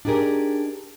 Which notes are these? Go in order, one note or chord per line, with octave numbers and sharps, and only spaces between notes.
D4 D#4 G4 G#4 A#4